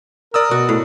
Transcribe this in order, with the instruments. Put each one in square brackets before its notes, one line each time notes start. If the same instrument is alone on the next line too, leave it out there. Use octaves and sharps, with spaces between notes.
[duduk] A#4 [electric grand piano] D5 D#6 E6
[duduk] B2 [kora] F#4
[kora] A2